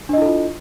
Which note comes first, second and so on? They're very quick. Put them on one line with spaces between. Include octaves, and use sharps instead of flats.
D4 D#5 E4 A4 F4